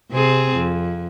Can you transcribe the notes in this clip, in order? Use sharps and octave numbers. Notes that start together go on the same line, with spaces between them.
C3 C4 G#4
F2